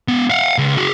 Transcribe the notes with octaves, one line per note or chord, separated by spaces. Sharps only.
G#3 B3
F5 F#5
C#2
F#4 G#4